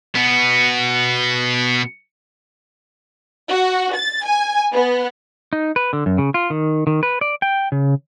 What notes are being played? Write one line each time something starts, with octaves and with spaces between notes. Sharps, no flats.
B2 B3
F#4
A6
G#5
B3
D#4
B4
D3
F#2
C#3
F4
D#3
D#3
B4
D5
G5
C#3